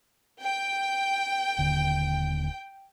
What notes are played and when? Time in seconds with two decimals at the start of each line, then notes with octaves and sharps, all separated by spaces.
0.41 G5
1.58 D#1 D3